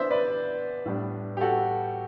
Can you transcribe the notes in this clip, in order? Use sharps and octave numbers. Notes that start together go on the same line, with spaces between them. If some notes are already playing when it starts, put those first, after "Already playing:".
Already playing: E3 B3 D4 C5 E5
B4 D5
A2 G3 B3 D4
G4
F#4 A4